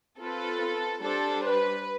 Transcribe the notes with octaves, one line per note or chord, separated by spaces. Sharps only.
C4 F4 A4 B4
G3 D4 G4 A4 C5
B4